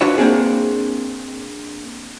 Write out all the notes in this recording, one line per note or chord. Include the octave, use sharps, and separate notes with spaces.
D4 F4 F#4 B4 C#5 E5
A#3 C4 D4 G#4